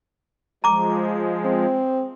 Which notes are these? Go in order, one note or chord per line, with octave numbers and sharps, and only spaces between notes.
F3 G#3 A#5 D6
C4